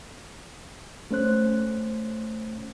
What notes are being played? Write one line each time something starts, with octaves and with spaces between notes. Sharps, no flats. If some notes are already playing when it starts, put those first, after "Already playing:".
A3 C#4 C5 F#6